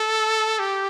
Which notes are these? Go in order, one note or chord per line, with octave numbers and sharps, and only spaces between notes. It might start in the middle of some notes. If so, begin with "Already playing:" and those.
Already playing: A4
G4